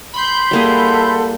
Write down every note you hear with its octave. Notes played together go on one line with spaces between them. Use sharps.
B5 C6 G6
G3 A#3 E4 G#4 A4 F#5